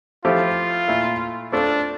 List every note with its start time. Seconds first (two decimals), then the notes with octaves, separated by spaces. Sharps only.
0.24 F3 A3 C4 E4 F4 G4
0.88 A#2 A3 E4 A4
1.53 A3 C4 D4 F4 A4